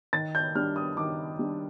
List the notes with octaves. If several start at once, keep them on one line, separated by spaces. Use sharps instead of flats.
D#3 A6
G6
G3 D4 F6
D#6
D#3 D6
G3 D4